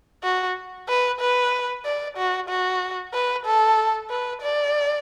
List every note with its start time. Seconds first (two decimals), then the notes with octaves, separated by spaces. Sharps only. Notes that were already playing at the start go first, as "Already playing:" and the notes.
0.24 F#4
0.89 B4
1.20 B4
1.85 D5
2.17 F#4
2.49 F#4
3.14 B4
3.46 A4
4.10 B4
4.42 D5